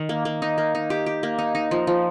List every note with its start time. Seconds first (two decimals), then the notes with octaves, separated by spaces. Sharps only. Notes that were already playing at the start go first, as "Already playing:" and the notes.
Already playing: D#3
0.09 A#3
0.25 A#3
0.42 D#4
0.58 A#3
0.75 D#4
0.90 G4
1.06 G4
1.23 A#3
1.38 D#4
1.55 D#4
1.71 F3
1.87 F3